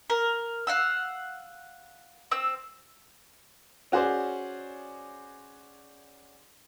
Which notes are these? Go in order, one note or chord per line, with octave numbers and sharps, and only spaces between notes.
A#4
F5 F#5 E6
C4 E6
C#4 F#4 G#4 C5 D5